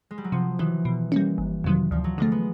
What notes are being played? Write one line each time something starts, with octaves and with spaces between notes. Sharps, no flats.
G#3
G3
F#3
C3 F3
D#3 E3 F#3
B2
G3 A#3 C#4
G1
F2 C3 D#3 F#3
D2 F3
F#3
D3 F3 G#3 A3
B3